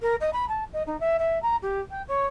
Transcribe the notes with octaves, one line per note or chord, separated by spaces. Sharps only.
A#4
D#5
B5
A5
D#5
D#4
E5
E5
A#5
G4
G5
C#5